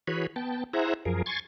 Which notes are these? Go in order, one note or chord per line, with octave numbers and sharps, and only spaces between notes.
E3 F#4 G#4 B4 C#5 B5
B3 G5 A5
E4 G#4 C5 E5 F#5 A#5
F#2 F3 G#4 A#4
G#5 C6 C#6 G#6 A6